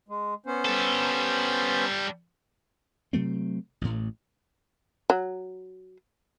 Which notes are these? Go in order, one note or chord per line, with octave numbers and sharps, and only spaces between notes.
G#3
B3 C#4 C5
G3 A4
C3 F#3 A3 C4
A1 A2
F#3